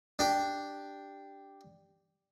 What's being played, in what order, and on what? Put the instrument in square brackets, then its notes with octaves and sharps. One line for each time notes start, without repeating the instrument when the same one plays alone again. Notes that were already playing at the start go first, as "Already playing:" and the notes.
[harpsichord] D4 G4